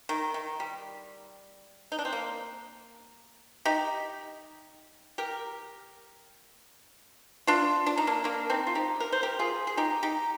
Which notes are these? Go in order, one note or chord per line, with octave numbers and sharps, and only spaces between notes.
D#3
D#3
G3
D#4
D4
C4
A#3
D#4 G4
G4 A#4
D4 F4
D4
D#4
A#3 D4
A#3 D4
C4 D#4
F4
D#4 G4
A#4
C5
G4 A#4
F4 G#4
G#4
D#4 G4
D#4 G4